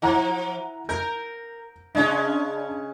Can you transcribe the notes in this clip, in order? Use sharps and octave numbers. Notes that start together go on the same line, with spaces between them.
F3 E4 F#5 A#5
A#4 G6
C#3 G#3 C#4 D4